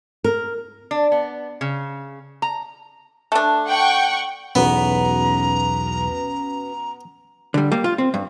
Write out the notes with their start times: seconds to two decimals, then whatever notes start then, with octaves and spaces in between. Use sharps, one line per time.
0.24 A#4
0.91 D4
1.12 B3
1.61 C#3
2.42 A#5
3.32 A3 D4
3.66 F#5 G5 C#6
4.55 B1 E2 B3 C#4 F#4 B4 A#5
7.54 D3 G3
7.72 G3 A#3
7.84 F4
7.98 C4
8.14 G2